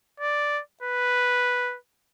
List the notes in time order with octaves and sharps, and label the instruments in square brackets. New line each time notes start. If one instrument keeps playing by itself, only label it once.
[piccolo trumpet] D5
B4